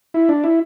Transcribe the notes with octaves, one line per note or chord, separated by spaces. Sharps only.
E4
D4
E4